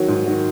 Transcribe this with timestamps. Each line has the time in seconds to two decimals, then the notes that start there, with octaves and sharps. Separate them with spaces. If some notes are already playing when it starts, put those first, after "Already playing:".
Already playing: D#3 F#3 C#5
0.08 G#2
0.26 D#3 F#3